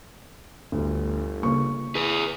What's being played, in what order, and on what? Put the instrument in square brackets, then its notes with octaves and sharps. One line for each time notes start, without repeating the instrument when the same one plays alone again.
[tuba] G1 [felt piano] D2
[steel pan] C#3 A#3 [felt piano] C#6
[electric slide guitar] G#4 B4